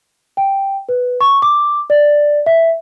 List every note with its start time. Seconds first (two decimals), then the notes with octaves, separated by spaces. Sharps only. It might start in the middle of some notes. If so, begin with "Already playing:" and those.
0.37 G5
0.89 B4
1.21 C#6
1.42 D6
1.90 D5
2.46 E5